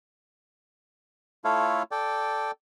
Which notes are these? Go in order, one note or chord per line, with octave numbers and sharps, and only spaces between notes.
A3 E4 F4 A4 C#5 F5
A4 D5 G5